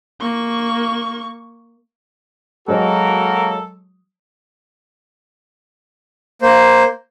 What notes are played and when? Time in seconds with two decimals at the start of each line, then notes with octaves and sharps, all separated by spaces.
0.21 A#3 C#6
2.68 F#3 G#3 A#3 F#4 A4 A#4
6.42 A#3 C5